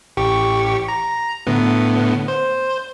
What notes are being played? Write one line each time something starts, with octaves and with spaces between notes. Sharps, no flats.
A1 G4 C#6
A#5
A2 D3 B3
C5